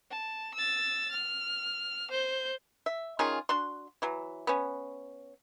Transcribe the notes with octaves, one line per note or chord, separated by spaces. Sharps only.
A5
E6 A6
F6
C5 G6
E5
D#3 C#4 F4 G#4
D4 F#4 C6
E3 F#3
B3 C#4